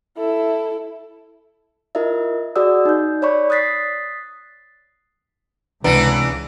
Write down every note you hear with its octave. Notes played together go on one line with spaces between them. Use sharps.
E4 A4
E4 F4 A#4 D#5 E5
F#4 G#4 D5 F#5 D#6 E6
D#4 G6
C#5 D5 B5 C#6
D#6 F#6 A6 B6 C7
C#2 C3 E3 B3 D4 D5 A#5